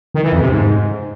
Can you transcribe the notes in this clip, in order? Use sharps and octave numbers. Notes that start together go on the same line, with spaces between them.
D#3
E3
F2
C3
G#2